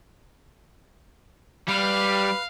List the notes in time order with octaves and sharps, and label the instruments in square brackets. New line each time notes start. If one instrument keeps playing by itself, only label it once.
[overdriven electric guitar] G3 [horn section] B4 [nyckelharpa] F5